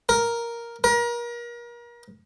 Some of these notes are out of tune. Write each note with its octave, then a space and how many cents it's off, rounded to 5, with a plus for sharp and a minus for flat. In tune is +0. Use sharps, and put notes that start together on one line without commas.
A#4 +5
A#4 +35